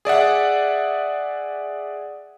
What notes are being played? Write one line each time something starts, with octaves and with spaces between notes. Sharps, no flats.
G#4 D5 E5 F#5